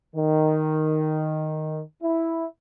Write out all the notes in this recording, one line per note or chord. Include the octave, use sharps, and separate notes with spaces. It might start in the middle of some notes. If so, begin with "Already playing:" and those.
D#3
E4